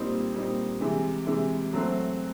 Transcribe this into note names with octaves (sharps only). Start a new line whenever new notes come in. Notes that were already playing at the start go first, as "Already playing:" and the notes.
Already playing: A#2 G3 C4 D#4
A#2 G3 C4 D#4
C3 E3 G#3
C3 E3 G#3
F#3 A3 C4